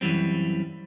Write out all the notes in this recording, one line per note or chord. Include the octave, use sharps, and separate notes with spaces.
F#2 E3 G3 C4